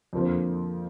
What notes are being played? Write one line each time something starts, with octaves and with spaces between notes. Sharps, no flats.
F2 D3 F3 A#3